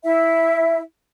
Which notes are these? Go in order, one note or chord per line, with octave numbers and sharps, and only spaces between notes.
E4 E5